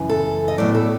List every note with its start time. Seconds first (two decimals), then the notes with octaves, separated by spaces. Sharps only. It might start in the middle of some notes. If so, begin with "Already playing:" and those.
Already playing: F#2 C#3 E3
0.09 A4
0.48 D#5
0.58 A2 F#3 B3 D5
0.75 A4